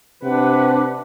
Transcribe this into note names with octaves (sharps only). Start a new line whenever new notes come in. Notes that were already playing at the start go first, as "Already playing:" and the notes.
C3 D4 B4 F#5